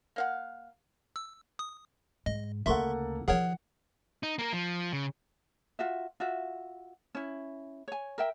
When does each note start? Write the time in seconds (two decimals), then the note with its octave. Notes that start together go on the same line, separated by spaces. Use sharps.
0.16 A#3 F5 F#5
1.16 E6
1.59 D#6
2.26 G#2 D#5
2.66 D2 C#3 A#3 A4 E5 F#5 C6 C#6
3.28 D#3 F3 G#4 A#4 C#5 F#5
4.23 D#4
4.39 A#3 A#4
4.53 F3
4.93 C#3
5.79 F4 F#4 E5
6.20 F4 F#4 E5
7.15 C#4 E4
7.88 C#5 G#5
8.18 A#4 E5 G5